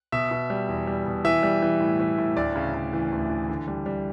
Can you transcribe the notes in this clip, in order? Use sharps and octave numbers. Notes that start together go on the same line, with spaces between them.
B2 E5
B2
G3
E2
G3
B2
E3 E5
G3
E3
A2
E3
A2
D2 D5
C#3
C#3
E3
D2
E3
D3
G3
G3